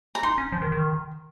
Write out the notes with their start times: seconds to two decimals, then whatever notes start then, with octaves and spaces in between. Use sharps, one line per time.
0.15 A#5
0.23 D#4 C6
0.38 C#4
0.52 F3
0.62 D#3
0.72 D#3